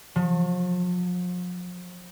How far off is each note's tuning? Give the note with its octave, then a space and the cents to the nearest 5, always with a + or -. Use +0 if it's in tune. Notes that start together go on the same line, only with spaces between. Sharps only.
F3 +40 C#6 -15